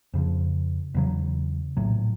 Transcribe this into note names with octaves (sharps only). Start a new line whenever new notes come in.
F2 C#3 F3
E2 C#3 F#3
A#1 A2 F#3